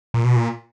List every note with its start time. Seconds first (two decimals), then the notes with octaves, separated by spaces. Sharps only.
0.14 A#2
0.24 B2
0.36 A#2